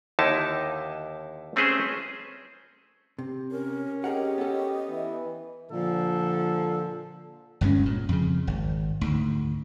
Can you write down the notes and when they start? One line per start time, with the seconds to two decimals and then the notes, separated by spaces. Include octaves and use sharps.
0.19 D#2 D3 D#4 E4 A5
1.56 A3 C4 C#4 G#4 B4 C5
3.19 C3
3.51 C#4 A#4
4.04 G4 G#4 A#4 D#5 F#5
4.38 B3 A4
4.90 E3
5.71 A#2 D3 F3 A4
7.61 G1 G2 G#3 C#4
7.86 A#2
8.09 F2 C#3
8.47 G#1
9.01 D2 G#2